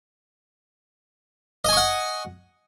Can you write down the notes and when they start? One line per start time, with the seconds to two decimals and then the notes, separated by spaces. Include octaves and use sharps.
1.65 D#5
1.69 G#5
1.73 C#6
1.77 F#5